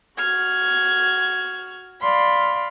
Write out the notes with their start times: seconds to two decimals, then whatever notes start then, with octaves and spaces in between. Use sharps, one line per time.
0.18 F#4 F6 G#6
2.01 D5 F5 B5 C6